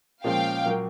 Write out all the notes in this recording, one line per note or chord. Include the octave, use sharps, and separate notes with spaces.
A#2 F3 G#3 C#4 F5 G5
A#2 F#3 A#3